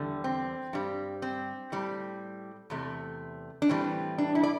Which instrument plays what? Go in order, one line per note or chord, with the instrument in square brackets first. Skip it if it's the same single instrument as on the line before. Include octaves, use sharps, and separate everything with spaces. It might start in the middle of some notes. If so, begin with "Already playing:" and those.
Already playing: [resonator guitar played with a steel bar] E2 D3 G3
C4
G2 G3
C4
A2 G3
E2 C3 A3
D4
A2 E3 G3 C4
D4
E4
D5